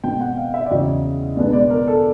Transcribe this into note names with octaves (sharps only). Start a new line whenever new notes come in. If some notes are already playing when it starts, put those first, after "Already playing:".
B2 G#3 C4 G5
F#5
F5
E5
D5
E2 C#3 F#3 D#5
B2 G#3 B3 D4 D5
D5
A#4
A4